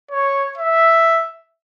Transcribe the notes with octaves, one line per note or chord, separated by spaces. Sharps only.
C#5
E5